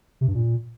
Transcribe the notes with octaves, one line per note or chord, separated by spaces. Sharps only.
C3
G2
A#2